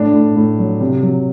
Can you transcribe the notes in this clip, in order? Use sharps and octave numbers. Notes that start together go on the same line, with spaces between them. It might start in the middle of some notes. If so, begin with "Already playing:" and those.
Already playing: A2 D4
A2
A2
F#3
C3
F#3